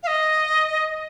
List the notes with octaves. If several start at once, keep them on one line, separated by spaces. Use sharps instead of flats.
F5
D#5